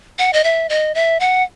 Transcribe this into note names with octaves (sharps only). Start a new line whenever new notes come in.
F#5
D#5
E5
D#5
E5
F#5